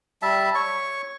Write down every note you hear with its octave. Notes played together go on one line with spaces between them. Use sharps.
G3 E5 A5
C#5 C#6